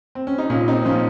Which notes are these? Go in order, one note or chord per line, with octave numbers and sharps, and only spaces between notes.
C4
C#4
D#4
A#2 C#4 F4
C4 D#4
F3 C#4 F4